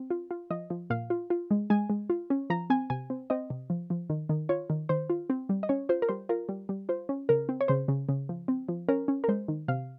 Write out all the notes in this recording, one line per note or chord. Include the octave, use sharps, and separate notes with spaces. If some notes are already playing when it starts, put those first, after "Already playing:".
Already playing: C4
F4
F4
F3 D#5
F3
A#2 F5
F4
F4
G#3
G#3 G#5
G#3
F4
C#4
F3 A#5
C4 G#5
C3 G#5
C4
C4 D#5
C3
F3
F3
D#3
D#3
F4 C#5
D#3
D#3 C5
F4
C4
G3
D#5
C#4 C#5
F4 C5
A#4
G3 C5
F4 A#4
G3
G3
F4 C5
C#4
C#3 A#4
C4
C#5
C#3 C5
C#3
C#3
F3
C4
F3
C#4 A#4
C#4
A#4
G#3 C5
D#3
C3 F5